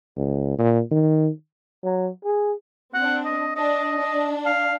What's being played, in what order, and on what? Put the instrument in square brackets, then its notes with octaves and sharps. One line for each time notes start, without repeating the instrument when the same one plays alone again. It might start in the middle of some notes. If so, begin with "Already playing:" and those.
[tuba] C#2
A#2
D#3
[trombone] F#3
G#4
[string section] C4 D4 [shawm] F#5
[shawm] D#5
[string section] D4 [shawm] D#5
[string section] D4
[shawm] F5